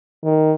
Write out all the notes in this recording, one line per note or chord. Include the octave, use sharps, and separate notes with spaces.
D#3